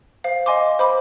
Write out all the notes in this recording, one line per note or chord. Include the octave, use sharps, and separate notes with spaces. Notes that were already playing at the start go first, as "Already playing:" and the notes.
C5 F5
D#5 G#5 C6 D6
C5 B5 D6